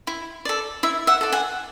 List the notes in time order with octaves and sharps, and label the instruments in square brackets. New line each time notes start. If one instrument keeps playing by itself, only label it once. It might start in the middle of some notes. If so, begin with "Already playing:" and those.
[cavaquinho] E4
A4 D5
E4 E5
E5 F#5
A4 D5
F#5 G#5